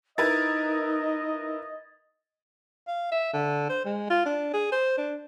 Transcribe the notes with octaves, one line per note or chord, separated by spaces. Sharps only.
D#4 E4 A#4 B4 D#5 G#6 A6
F5
E5
D3
C5
G#3
F4
D4
G#4
C5
D4